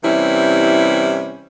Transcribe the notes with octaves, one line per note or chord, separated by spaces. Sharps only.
C3 E3 G3 C#4 E4